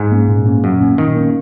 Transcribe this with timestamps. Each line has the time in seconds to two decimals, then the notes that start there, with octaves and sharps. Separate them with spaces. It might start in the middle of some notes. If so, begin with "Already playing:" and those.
Already playing: G#2
0.12 A#3 C#4
0.28 A#2
0.46 A#3 C#4
0.64 F#2 A#2
0.81 A#3 C#4
0.98 A#2 D#3
1.16 A#3 C#4